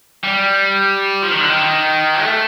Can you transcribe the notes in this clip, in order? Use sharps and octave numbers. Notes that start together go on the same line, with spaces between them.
G3
F3
D#3
D3
D#3
A3